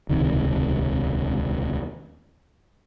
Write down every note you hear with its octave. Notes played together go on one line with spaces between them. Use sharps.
D#1 C#2 C3 D#3